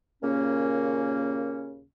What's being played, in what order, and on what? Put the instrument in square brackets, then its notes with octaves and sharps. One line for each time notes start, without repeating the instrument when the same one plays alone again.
[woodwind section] D#2 A#2 C#3 A#3 C#4